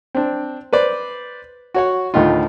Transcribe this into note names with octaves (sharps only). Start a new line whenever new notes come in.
C4 D4
B4 C5 D5
F#4 C#5 F#5
D2 A2 D#3 D#4 F4